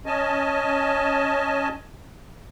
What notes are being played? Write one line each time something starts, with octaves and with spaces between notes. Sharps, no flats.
C#4 D#5 G#5 A5